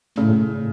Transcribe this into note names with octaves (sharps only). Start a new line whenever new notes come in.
A2 C#3